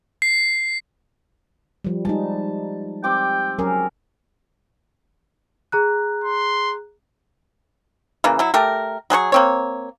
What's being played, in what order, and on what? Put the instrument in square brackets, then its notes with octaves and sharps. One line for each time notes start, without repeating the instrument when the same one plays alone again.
[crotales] C7
[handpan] F3 G3
[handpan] G3 G#3 D#4 [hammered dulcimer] A5
[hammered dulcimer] C4 G4 D6 [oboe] G5
[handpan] F#3 C#4 A#4 [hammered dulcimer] G#4
[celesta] G#4 A#5 F#6
[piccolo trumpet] C6
[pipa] C#3 E3 A#3
F#3 E4
A3 G4 A#4
F#3 G#4 B4 C#6
A#3 C4 C#5